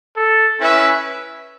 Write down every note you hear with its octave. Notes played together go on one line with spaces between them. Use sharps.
A4
C#4 E4 B4 E5